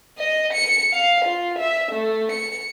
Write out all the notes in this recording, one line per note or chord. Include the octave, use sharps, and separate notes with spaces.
D#5
C#7
F5
F4
E5
A3
C#7